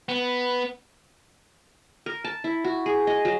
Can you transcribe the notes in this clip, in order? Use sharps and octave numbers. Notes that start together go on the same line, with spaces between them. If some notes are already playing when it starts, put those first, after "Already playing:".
B3
A#4
A5
E4
F#4
G#4
D#5
F#3